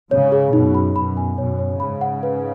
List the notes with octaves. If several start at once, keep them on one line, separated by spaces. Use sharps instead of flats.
G#2 C#3 C#5
G#4
F#2 B2 D#4
B5
F#2 B2 B5
G#5
F#2 B2 C#5
C#5
G#2 C#3 B5
F#5
B4